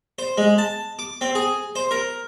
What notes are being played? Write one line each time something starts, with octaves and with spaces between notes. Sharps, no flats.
C5
G#3
A5
D6
C4
G#4
C5
A#4